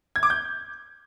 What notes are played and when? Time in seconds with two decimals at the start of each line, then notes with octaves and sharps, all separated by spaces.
0.16 G#6
0.23 D6
0.30 G6